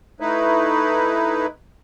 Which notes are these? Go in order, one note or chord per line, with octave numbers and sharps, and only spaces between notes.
A3 D#4 E4 B4